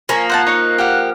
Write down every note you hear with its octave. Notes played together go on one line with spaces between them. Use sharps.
F3 A#3 C#5 G#5
C5 F#5 A5 F#6
D#4 C#5 D#5
G4 F5 F#5